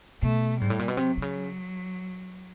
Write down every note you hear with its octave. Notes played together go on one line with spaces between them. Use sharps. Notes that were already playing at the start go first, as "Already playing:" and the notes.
B2 A3
G#2 G3
A2
A#2
B2
C3 F#3
C3
C#3